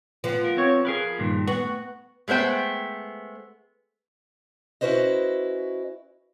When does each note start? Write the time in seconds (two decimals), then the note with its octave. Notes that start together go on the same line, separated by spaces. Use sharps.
0.24 F3 B3
0.44 A#4
0.57 C4 C#5
0.85 G#4 A#4 B4
1.19 G2 A#2 D#3
1.48 B3 F#4
2.28 G#3 A3 B3 C5 G5
4.81 C#4 E4 F#4 B4 C5 D#5